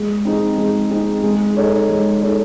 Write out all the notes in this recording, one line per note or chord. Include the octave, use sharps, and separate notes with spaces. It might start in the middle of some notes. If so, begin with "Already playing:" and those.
Already playing: G#3
C4 D#4 G#4
G#3
C4 D#4 G#4
G#3
D#4 A4 C#5
G#3
D#4 A4 C#5